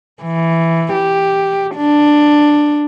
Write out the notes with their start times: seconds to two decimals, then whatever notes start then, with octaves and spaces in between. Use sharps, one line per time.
0.23 E3
0.93 G4
1.76 D4